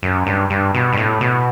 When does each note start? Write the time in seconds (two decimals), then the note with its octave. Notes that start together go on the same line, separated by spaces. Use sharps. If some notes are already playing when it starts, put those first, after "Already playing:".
0.03 F#2
0.27 G2
0.50 G2
0.74 B2
0.93 G2
0.97 A2
1.21 B2